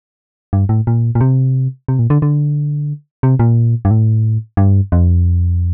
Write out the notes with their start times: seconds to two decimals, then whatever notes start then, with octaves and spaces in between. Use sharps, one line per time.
0.53 G2
0.69 A2
0.87 A#2
1.15 A#2
1.21 C3
1.88 C3
1.99 A#2
2.10 D3
2.22 D3
3.23 C3
3.39 A#2
3.85 G2
3.91 A2
4.57 G2
4.92 F2